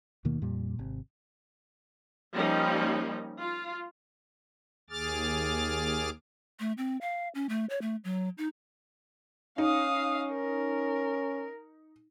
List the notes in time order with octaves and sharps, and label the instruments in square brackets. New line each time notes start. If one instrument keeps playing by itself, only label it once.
[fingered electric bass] D#2 B2 D#3 A#3
F2 A#2 G3
G#1 C3
[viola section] F3 G3 A#3 C#4 D#4
F4
[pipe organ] D#2 G#4 D6 F6 A6
[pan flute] A3
C4
F5
C#4
A3
C#5
A3
F#3
D#4
[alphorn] C#4 [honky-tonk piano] D#4 [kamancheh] F5 D#6
[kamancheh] A#4